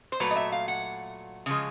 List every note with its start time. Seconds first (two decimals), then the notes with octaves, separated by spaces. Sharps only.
0.12 C5
0.20 A#2 F#3 A3 B4
0.31 D#5
0.36 E5
0.52 F5
0.68 F#5
1.46 C#3 F3 G#3